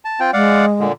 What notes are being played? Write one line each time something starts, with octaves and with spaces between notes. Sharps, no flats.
A5
C4 F4 G5
G#3 D5 F5 F#5
A#2 D3